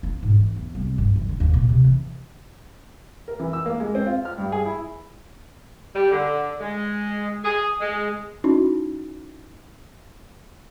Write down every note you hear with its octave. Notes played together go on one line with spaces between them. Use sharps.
F4
G#2
E3
E2
C2
G2
E3
D3
D#2
A#2
C3
E3
A#4
E3
E6
A#3
G#3
C4
F4
F6
G2
G#4
E4
G3
D3
G#3
G#4
G#3
C#4 D#4 E4 F#4